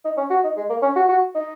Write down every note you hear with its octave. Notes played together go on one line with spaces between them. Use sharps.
D#4
C#4
F#4
D#4
G#3
A#3
C#4
F#4
F#4
D#4